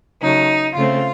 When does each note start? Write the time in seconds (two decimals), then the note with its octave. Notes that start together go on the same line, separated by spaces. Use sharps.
0.22 C#3 F#3 A3 D#4
0.76 C#3 A3 C4 F4